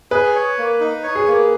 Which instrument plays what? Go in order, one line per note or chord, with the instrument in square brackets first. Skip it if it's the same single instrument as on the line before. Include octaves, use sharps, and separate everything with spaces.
[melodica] G#4 [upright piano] B4
[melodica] C#5
A#3
D#4
C#5
[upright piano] G#4
[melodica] A#3